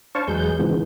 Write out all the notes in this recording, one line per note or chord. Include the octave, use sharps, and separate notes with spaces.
D4 C5 C#5 F5 A5 C#6
E2 F#3 G#3 G#4 B4 G6
G#2 C#3 E3 F3 G#3 B3